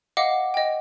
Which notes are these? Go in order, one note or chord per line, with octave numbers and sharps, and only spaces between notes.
D#5 F5 F#5 D6
D#5 G5